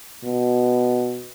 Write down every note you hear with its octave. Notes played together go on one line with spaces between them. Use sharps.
B2